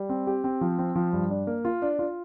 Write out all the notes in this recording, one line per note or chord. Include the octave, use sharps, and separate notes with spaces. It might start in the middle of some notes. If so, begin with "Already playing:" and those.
Already playing: G3
C4
G4
C4
F3
C4
F3
G2
D4
A#3
F4
D4
F4